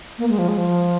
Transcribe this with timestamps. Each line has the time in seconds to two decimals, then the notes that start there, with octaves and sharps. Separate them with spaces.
0.18 A#3
0.29 G#3
0.38 F3
0.48 G#3
0.58 F3